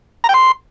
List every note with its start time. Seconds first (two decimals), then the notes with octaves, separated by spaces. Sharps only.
0.24 A#5
0.29 G5
0.34 C6